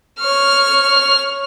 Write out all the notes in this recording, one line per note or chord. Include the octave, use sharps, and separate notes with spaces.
C#5 F6